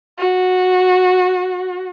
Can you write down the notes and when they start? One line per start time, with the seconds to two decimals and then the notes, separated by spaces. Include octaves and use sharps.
0.18 F#4